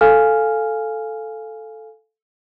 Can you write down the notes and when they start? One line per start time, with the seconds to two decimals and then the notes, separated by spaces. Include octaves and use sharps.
0.01 A4 F5 G#5 F6